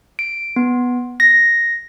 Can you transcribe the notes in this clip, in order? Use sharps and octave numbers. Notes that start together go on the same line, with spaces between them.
D7
B3
A#6